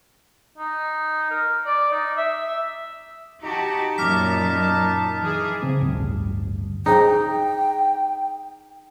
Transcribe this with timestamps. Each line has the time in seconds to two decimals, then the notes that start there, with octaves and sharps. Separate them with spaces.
0.58 D#4
1.30 A#4
1.65 D5
1.92 D#4
2.17 E5
3.43 D#4 F#4 G4 A5
3.98 F#2 A#2 D6 F6 B6
5.20 E3 G#4
5.63 C#3 C4
5.81 A1 D2 G2
6.86 D4 D#4 G#4 C5 G5